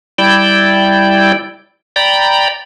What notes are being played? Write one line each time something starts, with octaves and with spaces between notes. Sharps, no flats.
G3 E4 D5 G5
D5 G5 A#5 B5